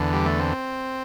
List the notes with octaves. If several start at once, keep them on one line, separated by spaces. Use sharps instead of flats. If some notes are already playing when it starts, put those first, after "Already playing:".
Already playing: E2 D3
G3
A3
C4